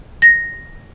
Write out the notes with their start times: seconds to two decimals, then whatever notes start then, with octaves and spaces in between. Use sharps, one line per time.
0.22 A#6